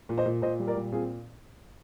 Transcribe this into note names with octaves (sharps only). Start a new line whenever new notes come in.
A#2
C5 D#5
A#2
A#2 C5 D#5
G3
A#4 D5
A#2
C4 F4 G#4